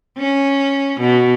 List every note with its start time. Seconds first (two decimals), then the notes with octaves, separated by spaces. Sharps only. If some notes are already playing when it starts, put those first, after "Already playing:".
0.18 C#4
1.01 B2